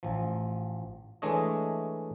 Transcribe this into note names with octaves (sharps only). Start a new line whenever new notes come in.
A1 F3
E3 G#3 A3 D4 C#5 D#5